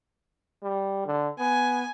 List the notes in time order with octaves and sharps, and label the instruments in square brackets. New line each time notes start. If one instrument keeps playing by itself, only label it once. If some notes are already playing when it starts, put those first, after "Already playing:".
[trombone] G3
D3
[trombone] B3 [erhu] G#5